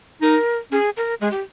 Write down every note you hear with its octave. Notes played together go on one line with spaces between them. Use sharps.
D#4 A#4
C#4 G#4
A#4
G#3 G#4
G4